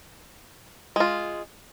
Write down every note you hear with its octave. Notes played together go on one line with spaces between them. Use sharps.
G#3 F4